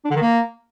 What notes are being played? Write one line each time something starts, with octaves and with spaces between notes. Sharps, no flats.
D4
D3
D#3
A#3